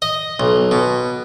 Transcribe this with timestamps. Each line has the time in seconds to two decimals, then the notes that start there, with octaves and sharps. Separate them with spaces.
0.02 D#5
0.40 B1
0.71 B2